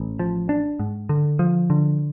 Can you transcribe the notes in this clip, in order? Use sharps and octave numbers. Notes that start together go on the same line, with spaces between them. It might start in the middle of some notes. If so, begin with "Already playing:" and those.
Already playing: A1
F3
D4
G#2
D3
F3
D3